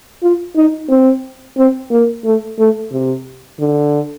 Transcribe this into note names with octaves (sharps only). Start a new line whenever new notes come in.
F4
D#4
C4
C4
A#3
A3
A3
C3
D3